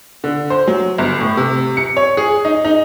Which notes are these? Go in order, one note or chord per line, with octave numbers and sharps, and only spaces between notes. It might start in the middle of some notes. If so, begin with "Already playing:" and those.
D3
C5
F#3
G1
A2
C3
C#7
C#5
G#4
D#4
D#4